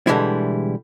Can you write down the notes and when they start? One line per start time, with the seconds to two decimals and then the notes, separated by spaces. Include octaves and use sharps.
0.07 B2 D3 E3 G3 G#3 E4